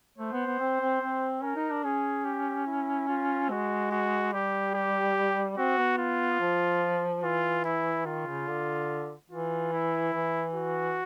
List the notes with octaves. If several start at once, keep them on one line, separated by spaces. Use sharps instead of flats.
A3 C5
B3
B3
C4
C4
C4
C#4 A#4
D#4
D4
C#4 G#4
G4
E4
F4
G#3 F#4
F#4
G3 G4
G4
C4 F#4
B3
F4
F3
E3 F4
E4
D#3 F4
C#3
D3
E3 F4
E4
E3
F#4